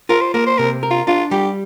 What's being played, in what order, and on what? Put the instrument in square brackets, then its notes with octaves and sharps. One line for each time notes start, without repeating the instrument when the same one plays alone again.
[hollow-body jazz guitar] F4 [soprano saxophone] A#4
[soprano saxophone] C5
[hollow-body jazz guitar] A#3 [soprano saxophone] A#4
[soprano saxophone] C5
[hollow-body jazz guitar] C3 [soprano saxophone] A#4
[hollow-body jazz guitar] A#4
[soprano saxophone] F4
[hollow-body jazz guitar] D4 [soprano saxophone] F4
[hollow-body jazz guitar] G3 [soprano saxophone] G4